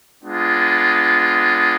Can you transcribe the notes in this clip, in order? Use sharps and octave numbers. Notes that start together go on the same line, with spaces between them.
G#3 B3 D4 F4